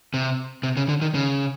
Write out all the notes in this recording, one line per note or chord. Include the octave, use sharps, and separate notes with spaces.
C3
C3
C#3
D3
D#3
C#3